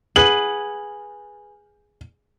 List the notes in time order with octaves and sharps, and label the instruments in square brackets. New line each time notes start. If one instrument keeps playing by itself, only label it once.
[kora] G#4 B4 F#5 [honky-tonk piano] F#7